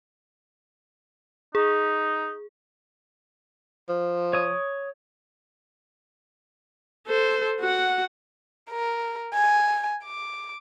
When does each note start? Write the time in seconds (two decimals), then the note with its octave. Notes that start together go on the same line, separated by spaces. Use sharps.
1.55 D#4 G#4
3.89 F3
4.33 C#5 D#6
7.07 A4 C5
7.60 F#4 F#5
8.70 A#4
9.34 G#5
10.05 D6